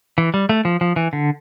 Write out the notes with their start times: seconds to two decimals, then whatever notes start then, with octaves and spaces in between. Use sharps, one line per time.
0.18 E3
0.34 G3
0.49 A3
0.65 F3
0.81 F3
0.96 E3
1.13 D3